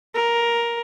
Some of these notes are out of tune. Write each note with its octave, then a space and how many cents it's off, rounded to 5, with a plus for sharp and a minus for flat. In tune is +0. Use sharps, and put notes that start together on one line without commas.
A#4 +10